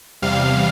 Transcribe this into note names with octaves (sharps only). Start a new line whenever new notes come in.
E2 C3 G3 F5